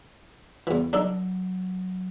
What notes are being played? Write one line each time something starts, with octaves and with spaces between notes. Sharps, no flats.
E2 E3
F#3 D4 D#4 A4